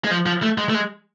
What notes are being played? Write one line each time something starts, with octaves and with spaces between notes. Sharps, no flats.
G#3
F3
F3
A3
G#3
A3
G#3